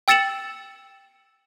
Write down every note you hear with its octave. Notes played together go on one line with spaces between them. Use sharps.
G5 E6 A6 C#7 E7 F#7